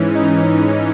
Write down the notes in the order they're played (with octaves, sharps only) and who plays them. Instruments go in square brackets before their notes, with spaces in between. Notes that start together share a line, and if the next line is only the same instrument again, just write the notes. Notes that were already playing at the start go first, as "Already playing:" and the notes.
Already playing: [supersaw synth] G#2 E3 C#4
D#4